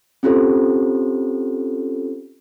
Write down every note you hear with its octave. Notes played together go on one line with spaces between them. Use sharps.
C4 C#4 F4 G4 A4 C5